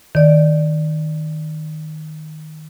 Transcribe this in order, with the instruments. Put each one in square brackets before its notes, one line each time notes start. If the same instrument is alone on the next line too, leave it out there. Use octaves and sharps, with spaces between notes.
[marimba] D#3 D5